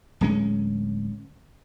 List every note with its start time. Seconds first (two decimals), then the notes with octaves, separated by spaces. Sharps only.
0.21 D1 G#3 C#4